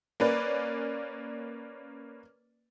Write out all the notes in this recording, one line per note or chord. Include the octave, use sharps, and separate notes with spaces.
A#3 C#4 B4 D5